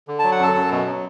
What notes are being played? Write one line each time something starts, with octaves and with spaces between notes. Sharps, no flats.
D3
F#3 A5
F#5
F#2 A4 A5
F#2
B2
F#3